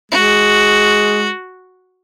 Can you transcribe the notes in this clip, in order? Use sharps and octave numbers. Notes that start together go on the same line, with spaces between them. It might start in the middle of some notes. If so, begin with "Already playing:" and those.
G#3 F#4